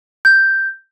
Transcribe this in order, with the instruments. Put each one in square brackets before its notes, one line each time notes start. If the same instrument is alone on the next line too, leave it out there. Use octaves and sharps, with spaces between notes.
[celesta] G6